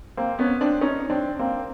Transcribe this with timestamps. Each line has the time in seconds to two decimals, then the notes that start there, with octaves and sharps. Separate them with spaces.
0.17 A#3 C4
0.39 B3 C#4
0.61 C4 D4
0.81 C#4 D#4
1.10 C4 D4
1.39 A#3 C4